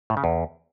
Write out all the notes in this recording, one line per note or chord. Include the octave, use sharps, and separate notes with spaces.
A2
C#3
E2